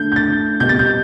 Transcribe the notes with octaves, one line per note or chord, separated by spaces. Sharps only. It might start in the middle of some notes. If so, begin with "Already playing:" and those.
Already playing: D3 A3 D4 G6
G6
A6
B2 G3 B3 G6
A6
G6